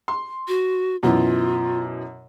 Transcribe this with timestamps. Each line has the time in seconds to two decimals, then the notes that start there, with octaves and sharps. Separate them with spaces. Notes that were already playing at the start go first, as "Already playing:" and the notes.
0.08 C6
0.48 F#4
1.03 F#2 B2 E3 F4